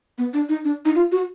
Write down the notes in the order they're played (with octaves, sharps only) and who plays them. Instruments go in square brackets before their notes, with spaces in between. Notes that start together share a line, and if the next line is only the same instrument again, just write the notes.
[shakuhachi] B3
D4
D#4
D4
D#4
F4
F#4